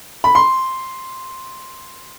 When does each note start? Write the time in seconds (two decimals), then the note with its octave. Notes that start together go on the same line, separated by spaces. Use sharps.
0.24 B5
0.35 C6